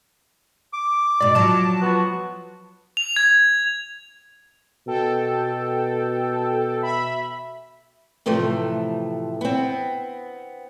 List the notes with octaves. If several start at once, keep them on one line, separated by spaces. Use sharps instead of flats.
D6
G#2 B2 D5
F3 F#3 A5
B3 F4 F#4
F7
G#6
B2 A4 G5
E5 B5
A2 C3 E3 F3 A3
B3 C4